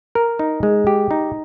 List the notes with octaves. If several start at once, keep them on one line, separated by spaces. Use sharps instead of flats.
A#4
D#4
G#3
G4
D#4